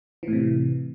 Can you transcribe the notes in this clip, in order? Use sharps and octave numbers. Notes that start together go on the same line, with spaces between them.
A2 C3 E3